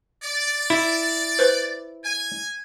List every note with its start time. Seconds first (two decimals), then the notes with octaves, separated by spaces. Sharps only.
0.23 D5
0.70 E4
1.39 B4 C5
2.05 G#5